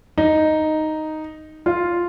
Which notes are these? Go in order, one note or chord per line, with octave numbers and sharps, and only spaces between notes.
D#4
F4